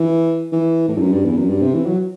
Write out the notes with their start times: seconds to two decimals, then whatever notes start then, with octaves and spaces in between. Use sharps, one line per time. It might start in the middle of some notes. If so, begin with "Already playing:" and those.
Already playing: E3
0.53 E3
0.88 A2
0.97 G2
1.01 F#2
1.13 G2
1.25 E2
1.37 F#2
1.50 G2
1.62 C3
1.74 E3
1.87 F#3